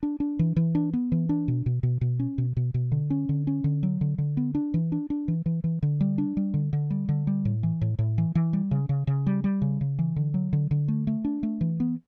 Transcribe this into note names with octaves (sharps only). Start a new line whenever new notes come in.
D4
D4
E3
E3
D4
B3
E3
D4
B2
B2
B2
B2
C#4
B2
B2
B2
D3
C#4
D3
C#4
D3
F#3
D3
D3
B3
D4
E3
D4
D4
E3
E3
E3
D3
G3
D4
G3
D3
D3
G3
D3
G3
A2
E3
A2
A2
E3
E3
G3
C#3
C#3
C#3
G3
G3
C#3
C#3
E3
D3
F#3
D3
D3
A3
A3
D4
A3
E3
B3